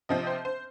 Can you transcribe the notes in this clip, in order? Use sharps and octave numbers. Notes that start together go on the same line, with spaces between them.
C3 F3 C4 D#5
C5
C5